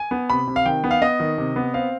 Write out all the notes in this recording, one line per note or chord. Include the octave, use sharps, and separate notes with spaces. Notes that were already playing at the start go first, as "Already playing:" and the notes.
Already playing: G#5
B3
C3 B5
C3
F5
D#3 G5
B3
F5
B3 D#5
D#3
C3
B3
C4 F5